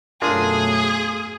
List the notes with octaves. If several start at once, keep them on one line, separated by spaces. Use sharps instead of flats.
F#2 B2 A3 D4 F4 G#4 A#4 D#6